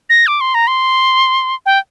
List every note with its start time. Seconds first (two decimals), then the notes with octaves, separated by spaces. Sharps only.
0.10 A#6
0.27 D6
0.41 C6
0.54 A#5
0.67 C6
1.66 G5